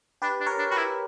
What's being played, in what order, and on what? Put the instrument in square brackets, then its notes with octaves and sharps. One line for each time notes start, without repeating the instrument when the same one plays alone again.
[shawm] D4 [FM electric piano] G4 B4
[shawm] D4
[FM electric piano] A#4 C#5
[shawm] D4
[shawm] F#4 [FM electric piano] G4 B4
[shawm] E4